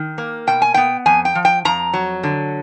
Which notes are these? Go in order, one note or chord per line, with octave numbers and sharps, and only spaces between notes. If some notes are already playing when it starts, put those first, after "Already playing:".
Already playing: D#3
A#3
B2 G5
G#5
B3 G5
F2 G#5
G5
F3
G5
F2 A#5
F#3
D3